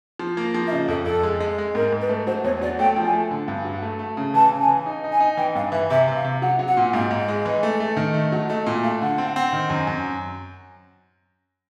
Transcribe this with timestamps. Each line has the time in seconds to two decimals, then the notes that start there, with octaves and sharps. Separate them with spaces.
0.19 F3
0.37 A#3
0.54 F3
0.67 E5
0.72 C#3 D#5
0.88 F2 A4
1.06 F2 A4
1.23 G#3
1.41 G#3
1.58 G#3
1.75 G#2 A#4
1.92 G#2
2.01 B4
2.09 A3
2.26 F#3 C5
2.44 E2 C#5
2.61 F#3 D5
2.79 A3 G5
2.96 F3
3.05 G#5
3.13 A3
3.31 D3
3.48 G2
3.65 F#3
3.82 A3
3.99 A3
4.17 C#3
4.34 E3 A5
4.52 C#3
4.60 G#5
4.68 E3
4.86 D#4
5.04 D#4
5.12 G#5
5.20 D#4
5.37 E3 G5
5.55 G2 F5
5.72 E3 E5
5.90 C3 E5
6.08 C3
6.15 F5
6.25 C3
6.42 F#3 F#5
6.59 F#3
6.68 F#5
6.77 A#2
6.93 G#2 F5
7.11 G#2
7.19 D#5
7.29 G#3
7.46 E3
7.63 A3
7.80 A3
7.97 D#3
8.14 A3
8.32 F#3
8.49 A3 D#5
8.66 A#2
8.83 A3 F5
9.01 D3 F#5
9.18 C4
9.36 C4
9.53 D#3
9.70 F#2
9.87 F#2